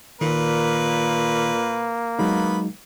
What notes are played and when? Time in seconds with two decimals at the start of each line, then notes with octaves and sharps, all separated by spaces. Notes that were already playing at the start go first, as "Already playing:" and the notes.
0.21 A#2 D#3 A#3 B4
2.19 F#3 G#3 B3 D#4 B5